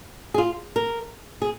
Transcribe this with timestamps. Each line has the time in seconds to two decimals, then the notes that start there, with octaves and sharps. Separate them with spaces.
0.34 G#4
0.38 F4
0.76 A#4
1.42 G#4